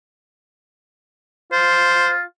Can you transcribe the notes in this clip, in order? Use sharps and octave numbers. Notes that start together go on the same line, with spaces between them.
F4 C5